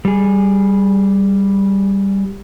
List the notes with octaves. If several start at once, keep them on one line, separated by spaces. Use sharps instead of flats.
G3 G#4